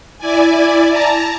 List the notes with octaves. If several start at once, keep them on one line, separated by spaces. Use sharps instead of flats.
E4 D5 G#5
A5 A#5